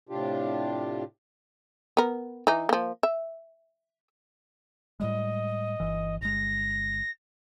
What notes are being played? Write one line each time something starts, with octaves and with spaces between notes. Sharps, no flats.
A2 C3 D4 F4 G4
B3 A#4
E3 D#4
F3 A#3
E5
A2 G3 G#3 D#5
G1 E3
G1 G#3 A#6